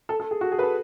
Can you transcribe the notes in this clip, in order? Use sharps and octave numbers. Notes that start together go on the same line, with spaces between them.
A4
A4
G#4
F#4
G#4
B4
A4